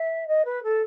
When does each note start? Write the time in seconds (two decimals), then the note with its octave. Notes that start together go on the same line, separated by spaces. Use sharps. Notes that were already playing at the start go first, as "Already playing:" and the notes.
Already playing: E5
0.27 D#5
0.45 B4
0.63 A4